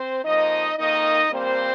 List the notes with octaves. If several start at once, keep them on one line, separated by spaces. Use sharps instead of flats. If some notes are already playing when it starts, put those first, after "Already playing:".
Already playing: C4 C5
F2 F3 A#3 D#4 D#5
F2 D#3 A#3 D#4 D#5
A#2 G3 A#3 C4 C5